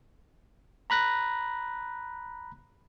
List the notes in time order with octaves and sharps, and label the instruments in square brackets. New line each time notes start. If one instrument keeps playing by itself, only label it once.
[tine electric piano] A#5 B5 F#6 A#6